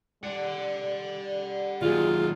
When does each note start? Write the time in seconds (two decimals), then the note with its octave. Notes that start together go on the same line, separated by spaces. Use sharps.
0.23 G3 D5 F#5
1.82 D#2 F#3 F4 G#4